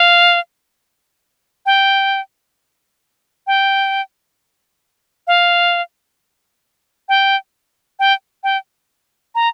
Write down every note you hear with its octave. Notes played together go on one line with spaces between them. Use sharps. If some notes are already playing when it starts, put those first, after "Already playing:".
Already playing: F5
G5
G5
F5
G5
G5
G5
A#5